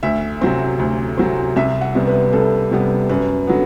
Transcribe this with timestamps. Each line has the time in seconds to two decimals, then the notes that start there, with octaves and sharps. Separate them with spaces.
0.03 D2 E5
0.41 C3 F#3 C4
0.79 D2
1.17 C3 F#3 C4
1.56 C2 E5
1.81 F#5
1.95 C3 G3 B3
2.07 B4
2.33 C2 A4
2.71 C3 G3 B3
3.09 F#2 B4
3.47 D3 F#3 B3